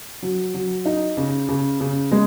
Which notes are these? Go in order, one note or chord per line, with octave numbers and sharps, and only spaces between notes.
F#3
F#3
D#4
C#3
C#3
C#3
G#3